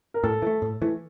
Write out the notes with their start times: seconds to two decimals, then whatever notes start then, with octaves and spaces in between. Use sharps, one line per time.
0.14 A#4
0.24 A2 A4
0.42 E3
0.47 A3
0.62 A2
0.82 E3 A3